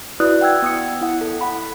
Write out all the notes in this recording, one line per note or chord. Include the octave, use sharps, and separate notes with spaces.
E4 F#4 B4 D5 D#6 F#6
F#5 G5 E6 G#6
B3 D#6 C#7
E4 F#5
A4
F#5 B5